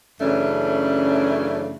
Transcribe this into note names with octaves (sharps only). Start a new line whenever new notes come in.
F#2 C#3 E3 A3 C#4 D4